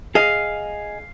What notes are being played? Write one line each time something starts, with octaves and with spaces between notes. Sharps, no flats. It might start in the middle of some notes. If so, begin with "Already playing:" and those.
G#4 D#5 F5